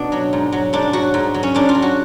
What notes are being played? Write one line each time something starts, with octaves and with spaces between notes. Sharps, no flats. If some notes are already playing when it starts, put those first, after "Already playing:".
Already playing: B2 B3 D4
F#3
G#2
F#3
G#2 D4
F#3 F#4
G#2
F#3
C#4
G#2 D4
F4
F#3
F#4